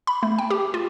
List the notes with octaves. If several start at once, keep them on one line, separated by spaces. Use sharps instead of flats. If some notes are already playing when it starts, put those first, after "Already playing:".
B5
A3
G5
G4
F4